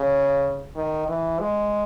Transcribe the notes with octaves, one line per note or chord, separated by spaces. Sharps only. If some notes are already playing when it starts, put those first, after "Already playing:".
Already playing: C#3
D#3
E3
G#3